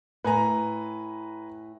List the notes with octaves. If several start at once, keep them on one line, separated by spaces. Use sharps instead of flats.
A2 B4 G#5 A#5